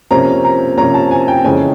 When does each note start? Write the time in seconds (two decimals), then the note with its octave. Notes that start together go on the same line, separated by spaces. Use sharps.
0.11 C3 F3 A#3 C#4 A#5
0.45 A#5
0.78 C3 F3 A#3 C#4 A#5
0.94 A5
1.11 G#5
1.28 G5
1.44 F2 C#3 E3 G#3 C#4 G#5